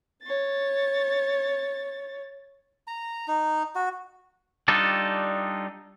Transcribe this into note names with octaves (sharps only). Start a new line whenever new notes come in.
C#5 A6
A#5
D#4
F#4
G3 D4 D#4 F4 G4 A4